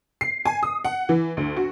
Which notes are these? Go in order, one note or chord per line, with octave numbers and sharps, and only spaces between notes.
C7
G#5
D#6
F#5
E3
D2
F#4